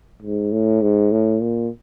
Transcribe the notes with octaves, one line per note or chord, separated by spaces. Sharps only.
G#2
A2
G#2
A2
A#2